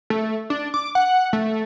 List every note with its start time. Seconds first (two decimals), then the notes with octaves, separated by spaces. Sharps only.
0.10 A3
0.50 D4
0.74 D6
0.95 F#5
1.33 A3